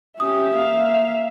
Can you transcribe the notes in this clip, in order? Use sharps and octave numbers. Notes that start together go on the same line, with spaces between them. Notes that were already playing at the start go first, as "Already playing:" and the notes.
C#4 G4 E5 D#6
A#3 F5